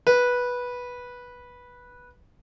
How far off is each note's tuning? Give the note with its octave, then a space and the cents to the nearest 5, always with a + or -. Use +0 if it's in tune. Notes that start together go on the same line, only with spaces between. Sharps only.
B4 -10